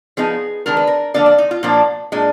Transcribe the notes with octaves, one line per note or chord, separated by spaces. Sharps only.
F3 B3 D#4 G#4
D#3 G#3 D4 A#4
B4
A#4
D3 F3 A#3 D4 D5
D5
D#4
F4
A#2 F3 A#3 D4
A#2 G#3 D4